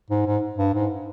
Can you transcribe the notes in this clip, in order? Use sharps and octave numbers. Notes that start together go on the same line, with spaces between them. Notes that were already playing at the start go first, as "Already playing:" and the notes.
G#2
G#2
G2
G#2